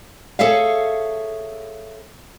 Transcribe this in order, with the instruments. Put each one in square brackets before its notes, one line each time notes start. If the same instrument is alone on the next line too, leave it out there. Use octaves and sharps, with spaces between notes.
[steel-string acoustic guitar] G#4 A4 C#5 E5 F5